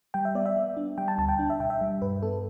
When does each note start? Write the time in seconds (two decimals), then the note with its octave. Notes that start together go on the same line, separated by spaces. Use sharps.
0.14 G3 G5
0.25 E5
0.35 B3 D5
0.46 E5
0.56 B3
0.77 D4
0.98 G3 G5
1.08 A5
1.18 D2 A5
1.29 G5
1.39 D4
1.50 E5
1.60 B2 G5
1.70 E5
1.81 G3
2.02 G2 B4
2.23 B3 A4